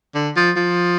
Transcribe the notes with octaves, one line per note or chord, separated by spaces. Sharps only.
D3
F3
F3